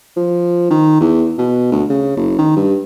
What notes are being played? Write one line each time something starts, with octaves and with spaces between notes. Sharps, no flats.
F3
D#3
E2
B2
D2
C#3
F#1
D#3
G2